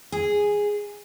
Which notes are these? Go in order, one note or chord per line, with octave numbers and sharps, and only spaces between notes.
G#4